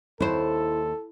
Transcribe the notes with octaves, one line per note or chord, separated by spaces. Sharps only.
D#2 E4 A4 C5